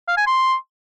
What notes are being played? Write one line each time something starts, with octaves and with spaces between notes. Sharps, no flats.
F5
G#5
C6